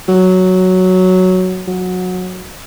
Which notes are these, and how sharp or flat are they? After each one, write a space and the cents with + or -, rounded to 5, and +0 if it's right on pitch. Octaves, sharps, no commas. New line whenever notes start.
F#3 +0
F#3 -20